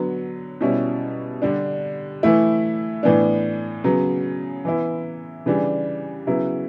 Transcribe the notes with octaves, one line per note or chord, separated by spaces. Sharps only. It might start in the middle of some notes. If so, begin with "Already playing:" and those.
Already playing: D3 F#3 B3
B2 G3 C#4 E4
D3 G3 D4
E3 A3 E4
A2 E3 B3 D4
C#3 F#3 B3
E3 B3 E4
C#3 E3 G3 D4
C#3 F#3 B3 E4